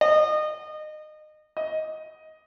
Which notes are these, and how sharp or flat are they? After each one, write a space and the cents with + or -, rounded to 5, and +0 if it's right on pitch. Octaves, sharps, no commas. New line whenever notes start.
D#5 -25
D#5 +10